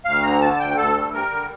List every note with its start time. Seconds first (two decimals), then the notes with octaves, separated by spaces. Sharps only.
0.05 D2 F5
0.23 D3 A#5
0.41 D3 A5
0.53 A5
0.59 D2 G5
0.77 D2 A4
0.95 G3
1.13 G3 A#4
1.32 D3